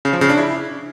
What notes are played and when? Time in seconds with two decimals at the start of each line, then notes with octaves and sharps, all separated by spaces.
0.05 C#3
0.13 F3
0.21 C#3
0.29 D4
0.38 E4